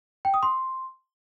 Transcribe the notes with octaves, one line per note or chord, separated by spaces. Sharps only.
G5
D#6
C6